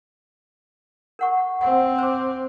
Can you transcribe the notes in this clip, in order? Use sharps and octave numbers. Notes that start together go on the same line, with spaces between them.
A#4 F#5 C#6
C4 F#5
C5 D6